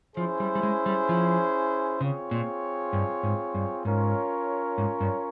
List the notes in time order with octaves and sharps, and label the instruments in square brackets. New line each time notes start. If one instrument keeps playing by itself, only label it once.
[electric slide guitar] F3 [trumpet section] C#4 E4 G#4 C5
[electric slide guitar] G3
G3
G#3
G3
F3
[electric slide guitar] C#3 [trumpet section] C4 F4 G#4 C#5
[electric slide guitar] A#2
G2
G#2
G2
[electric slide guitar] G#2 [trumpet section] C#4 F4 A#4 C#5
[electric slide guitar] G#2
G2